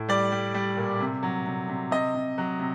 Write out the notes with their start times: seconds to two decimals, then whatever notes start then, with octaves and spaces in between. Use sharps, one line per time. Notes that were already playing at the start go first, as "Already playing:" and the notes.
Already playing: A2
0.09 G3 D5
0.32 G3
0.54 G3
0.77 A#2
1.00 C3
1.23 F#3
1.46 C3
1.69 C3
1.91 C3 D#5
2.15 C3
2.38 F#3
2.59 C3